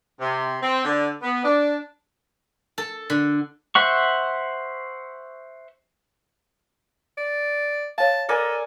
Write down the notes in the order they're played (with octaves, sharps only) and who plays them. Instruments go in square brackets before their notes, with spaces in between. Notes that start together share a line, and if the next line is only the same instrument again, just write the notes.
[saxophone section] C3
C4
D3
B3
D4
[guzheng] A4
D3
[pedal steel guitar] C5 E5 F#5 C#6
[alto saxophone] D5
[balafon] C#5 F5 [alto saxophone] A5
[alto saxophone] A4 [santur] A#4 D5 G#5